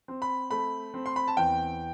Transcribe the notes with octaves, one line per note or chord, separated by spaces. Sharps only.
C4
B5
A3 B5
C4
C6
B5
A5
E2 G5